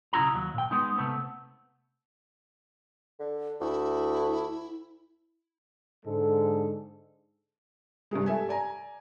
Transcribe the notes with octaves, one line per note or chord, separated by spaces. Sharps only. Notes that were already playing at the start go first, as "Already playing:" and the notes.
B1 C#3 E4 F#4 A#5
D#2 F#3
A#2 G5
G#3 B3 D#4
C3 A3 B3 C4
D3
D2 E4
G#2 D3 G#3 A4
G2 C3 G3 G#3
G4 A4 E5 G#5
D5 G#5 A#5